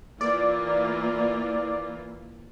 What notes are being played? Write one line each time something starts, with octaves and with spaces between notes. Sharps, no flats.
E3 A#3 F4 D5